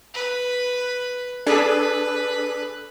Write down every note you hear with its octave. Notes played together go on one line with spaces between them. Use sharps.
B4
D4 G#4 A4 B4